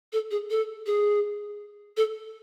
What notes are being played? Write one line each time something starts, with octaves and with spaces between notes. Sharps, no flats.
A4
G#4
A4
G#4
A4